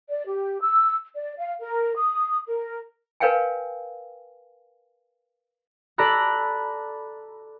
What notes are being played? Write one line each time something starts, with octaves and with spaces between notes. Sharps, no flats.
D5
G4
E6
D5
F5
A#4
D#6
A#4
A#4 B4 C#5 F5 G5 G#5
A4 D5 A#5 B5 F#6